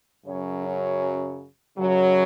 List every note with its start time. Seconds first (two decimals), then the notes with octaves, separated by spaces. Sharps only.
0.25 F#2 C#3 F#3 C#5
0.64 C#4
1.77 F#2 C#3 F#3